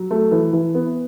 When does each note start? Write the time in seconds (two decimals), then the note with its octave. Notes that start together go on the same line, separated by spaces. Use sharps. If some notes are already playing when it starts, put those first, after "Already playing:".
Already playing: F#3
0.11 A3
0.31 E3
0.53 E3
0.74 B3